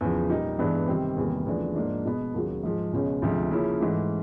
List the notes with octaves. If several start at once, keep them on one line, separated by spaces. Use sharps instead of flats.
E2 C#3 F3
A#2 G3 A#3 D#4
G2 E3 G#3 B3 D4
C3 D#3 G3 C4
E2 C3 D#3 G3 A#3
E2 C#3 F3 A3 D4
G#2 F3 A#3 D4
B2 G#3 B3
D#2 C#3 F#3
G#2 F3 G#3
C#2 B2 G#3 C#4
D2 C3 F3 G#3
C#3 F3 A#3 C#4 E4
G#2 E3 A3